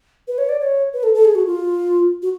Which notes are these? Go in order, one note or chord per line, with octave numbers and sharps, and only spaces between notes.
B4
C#5
D5
C#5
B4
A4
A4
G#4
F#4
F4
F#4